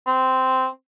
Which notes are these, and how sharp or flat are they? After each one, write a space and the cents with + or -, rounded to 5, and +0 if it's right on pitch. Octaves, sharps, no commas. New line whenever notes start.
C4 -10